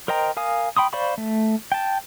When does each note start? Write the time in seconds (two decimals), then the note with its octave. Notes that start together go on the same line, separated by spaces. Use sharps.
0.08 A#4 C5 D#5 G5 A#5
0.37 A#4 F5 G#5 D#6
0.77 G5 B5 C6 D#6
0.93 C5 D5 F5 B5 C#6
1.18 A3
1.72 G5 A5